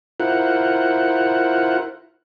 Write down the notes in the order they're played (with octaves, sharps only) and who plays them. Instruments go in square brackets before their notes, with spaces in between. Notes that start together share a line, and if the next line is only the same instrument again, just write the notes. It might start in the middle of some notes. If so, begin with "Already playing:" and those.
[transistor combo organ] E4 F4 A#4 C5 F#5